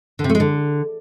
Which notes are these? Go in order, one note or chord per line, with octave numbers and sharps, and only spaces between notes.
D3
C3
A3
G#3
D3